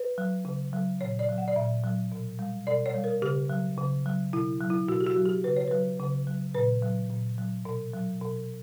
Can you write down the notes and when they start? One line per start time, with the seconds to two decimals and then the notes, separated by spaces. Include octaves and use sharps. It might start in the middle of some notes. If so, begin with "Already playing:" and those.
Already playing: B4
0.18 F#3
0.45 C#3
0.73 F#3
1.01 A#2 C#5
1.19 D5
1.29 F#3
1.38 F#5
1.48 D5
1.56 A#2 E5
1.84 F#3
2.12 B2
2.39 G3
2.67 B2 D5
2.86 C#5
2.94 G3
3.04 A#4
3.22 C#3 G4
3.50 F#3
3.78 C#3
4.06 F#3
4.33 B2 E4
4.61 F#3
4.70 E4
4.88 B2 F#4
5.01 G4
5.07 F#4
5.16 F#3
5.26 G4
5.44 C#3 B4
5.56 C#5
5.68 F#3 B4
5.99 C#3
6.27 F#3
6.55 A#2 B4
6.82 F#3
7.10 A#2
7.38 F#3
7.65 B2
7.93 F#3
8.21 B2